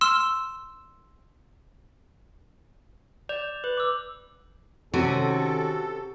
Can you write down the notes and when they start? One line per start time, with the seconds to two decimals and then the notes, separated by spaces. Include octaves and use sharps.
0.01 C6 E6 F6 E7
3.29 D5 G6 F7
3.64 B4 F#7
3.77 D6 E6
4.94 C3 D#3 C#4 F#4 A4